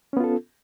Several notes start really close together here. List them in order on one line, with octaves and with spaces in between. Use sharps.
C#4 B3 F4 A4